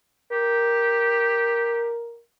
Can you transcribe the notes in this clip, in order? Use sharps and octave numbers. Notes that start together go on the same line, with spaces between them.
G4 A#4